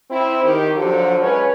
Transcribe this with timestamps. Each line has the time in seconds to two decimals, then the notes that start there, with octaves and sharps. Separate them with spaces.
0.10 C4 E4
0.43 D#3 G4
0.74 D3 F3 F#3
1.21 G#3 C#4 B4 C#5